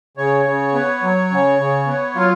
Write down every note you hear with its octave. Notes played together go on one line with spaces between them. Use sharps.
C#3 C#5
C#3
B3
F#3
C#3
C#3
B3
F#3 F4